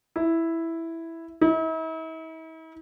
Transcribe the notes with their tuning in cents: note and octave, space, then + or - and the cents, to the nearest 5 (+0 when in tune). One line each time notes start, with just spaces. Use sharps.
E4 +0
E4 -45